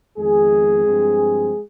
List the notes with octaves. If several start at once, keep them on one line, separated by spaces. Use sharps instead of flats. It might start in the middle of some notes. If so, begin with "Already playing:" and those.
F2 D#3 G#3 B3 G#4
G2 F3 C4